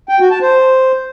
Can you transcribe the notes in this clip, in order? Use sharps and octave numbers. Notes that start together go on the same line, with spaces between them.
G5
F#4
A5
C5